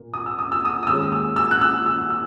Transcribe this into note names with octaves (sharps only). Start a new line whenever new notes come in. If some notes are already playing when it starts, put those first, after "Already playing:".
Already playing: A#2 A#3
D#6
E6
D#6
E6
D#6
D#6
D#2 D#3 G#3 C#4 E6
E6
E6
F#6
E6
E6
E6